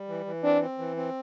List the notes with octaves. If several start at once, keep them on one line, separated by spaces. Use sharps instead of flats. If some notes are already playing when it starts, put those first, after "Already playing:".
Already playing: G3
E3
E3
C4 D4
C4
E3
C4